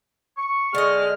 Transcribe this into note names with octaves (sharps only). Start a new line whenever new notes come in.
C#6
D3 G#3 D#5 F6